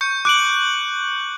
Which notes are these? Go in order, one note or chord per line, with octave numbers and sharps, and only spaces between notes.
C#6 G6 C#7
D6 F#6 D7 F#7